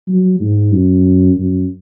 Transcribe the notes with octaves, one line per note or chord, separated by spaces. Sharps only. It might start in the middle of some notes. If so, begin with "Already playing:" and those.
F#3
G#2
F#2
F#2